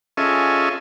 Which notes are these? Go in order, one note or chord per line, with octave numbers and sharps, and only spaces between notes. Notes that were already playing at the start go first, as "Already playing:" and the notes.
C#4 F4 G#4 A4 D#5 E5